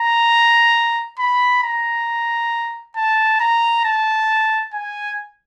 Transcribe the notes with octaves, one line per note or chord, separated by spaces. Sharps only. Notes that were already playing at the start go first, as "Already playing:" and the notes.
Already playing: A#5
B5
A#5
A5
A#5
A5
G#5